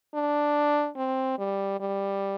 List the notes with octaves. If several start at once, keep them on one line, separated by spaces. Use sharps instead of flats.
D4
C4
G3
G3